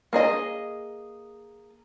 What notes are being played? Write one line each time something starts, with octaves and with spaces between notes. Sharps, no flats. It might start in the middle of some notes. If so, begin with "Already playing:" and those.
A#3 G#4 D#5